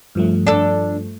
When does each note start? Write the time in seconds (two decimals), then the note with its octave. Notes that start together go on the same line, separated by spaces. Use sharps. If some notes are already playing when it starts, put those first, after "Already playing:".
0.15 G2 F3 A3
0.47 D4 A4